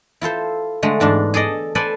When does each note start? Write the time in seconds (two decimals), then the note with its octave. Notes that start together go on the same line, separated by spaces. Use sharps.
0.21 E4 F4 A4 C5
0.83 D3 G#3 A3
1.00 E2 G#2 D4 A5
1.34 G#4 A4 D5 D#5
1.75 A4 B4 C5 D5 G#5 B5